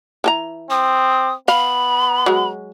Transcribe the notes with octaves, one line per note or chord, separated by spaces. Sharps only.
E3 A4 A#5
C4 D#6
B3 F5 B5
F#3 G#3